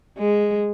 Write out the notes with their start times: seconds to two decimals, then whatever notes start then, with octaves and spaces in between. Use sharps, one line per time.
0.18 G#3